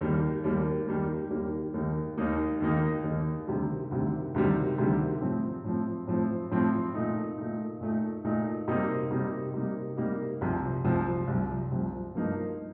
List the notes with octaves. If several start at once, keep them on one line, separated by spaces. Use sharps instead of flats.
D#2 D#3 G3 A#3
D#2 D#3 G3 A#3
D#2 D#3 G3 A#3
D#2 D#3 G3 A#3
D#2 D#3 A#3 D#4
D#2 D#3 A#3 D#4
D#2 D#3 A#3 D#4
D#2 D#3 A#3 D#4
D2 C3 D#3 G3
D2 C3 D#3 G3
D2 C3 D#3 G3
D2 C3 D#3 G3
A2 F3 C4
A2 F3 C4
A2 F3 C4
A2 F3 C4
A#2 A3 D#4
A#2 A3 D#4
A#2 A3 D#4
A#2 A3 D#4
C3 G3 A#3 D#4
C3 G3 A#3 D#4
C3 G3 A#3 D#4
C3 G3 A#3 D#4
C2 C3 F3
C2 C3 F3
C2 C3 F3
C2 C3 F3
G2 F3 A#3 D#4